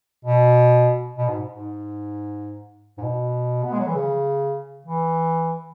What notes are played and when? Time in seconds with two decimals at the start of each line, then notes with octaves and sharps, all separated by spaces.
0.25 B2
1.18 B2
1.28 G#2
1.50 G#2
2.98 G#2
3.02 B2
3.64 B3
3.72 G#3
3.79 F#3
3.87 E3
3.94 C#3
4.86 E3